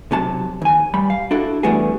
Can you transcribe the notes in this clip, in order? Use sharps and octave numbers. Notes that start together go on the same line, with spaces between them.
B1 C3 F#3 A5
D#2 G#5
G2 G3 B5
F5
D4 E4 F#4 A4
E3 G3 A3 B3 F#4 G#4